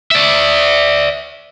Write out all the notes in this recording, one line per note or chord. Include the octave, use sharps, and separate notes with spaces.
D5 E5